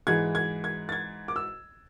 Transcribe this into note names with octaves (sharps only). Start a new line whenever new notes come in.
G#2 E3 G#3 G#6
G#6
G#6
A6
G#6
D6
E6